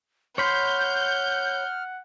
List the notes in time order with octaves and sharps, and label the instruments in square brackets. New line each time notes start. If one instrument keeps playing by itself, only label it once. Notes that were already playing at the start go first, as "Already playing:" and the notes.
[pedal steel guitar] C#5 B5 C6 [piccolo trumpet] F#5 [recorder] F6 [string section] G6